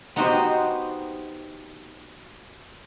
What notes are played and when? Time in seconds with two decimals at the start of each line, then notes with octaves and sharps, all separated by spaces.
0.16 B3 D#4 F#4 G4 C5